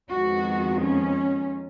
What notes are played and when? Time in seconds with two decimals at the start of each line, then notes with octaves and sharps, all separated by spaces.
0.10 F2 D#3 G#3 B3 F#4
0.80 C#4